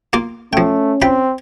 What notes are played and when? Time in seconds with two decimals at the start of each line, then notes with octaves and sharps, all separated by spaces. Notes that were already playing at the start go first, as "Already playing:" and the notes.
0.13 A#3 F4 D6
0.53 F3 A3 C#4 G5
1.02 C4 F4 G5 B5